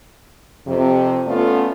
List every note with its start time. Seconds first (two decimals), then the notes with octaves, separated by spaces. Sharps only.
0.67 F2 C3
1.27 A3 B3 C#4 F4 A4 D5